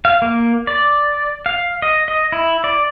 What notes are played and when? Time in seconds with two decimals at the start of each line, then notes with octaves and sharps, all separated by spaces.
0.05 F5
0.22 A#3
0.67 D5
1.46 F5
1.82 D#5
2.08 D#5
2.32 E4
2.64 D5